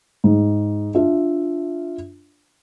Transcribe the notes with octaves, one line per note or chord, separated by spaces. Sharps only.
G#2
D4 F4 E5